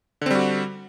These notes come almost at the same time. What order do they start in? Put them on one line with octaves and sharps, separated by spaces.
D3 C4 G3 F#4